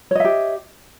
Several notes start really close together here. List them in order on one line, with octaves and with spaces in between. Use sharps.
C#5 D#5 E5 G4